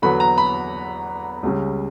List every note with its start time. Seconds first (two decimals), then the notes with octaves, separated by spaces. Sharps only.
0.02 E2 D3 F#3 B3 B5
0.20 A#5
0.38 B5
1.43 C#2 C#3 G3 C#4